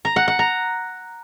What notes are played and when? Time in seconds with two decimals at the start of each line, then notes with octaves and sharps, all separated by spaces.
0.05 A#5
0.16 F#5
0.28 F#5
0.39 A#5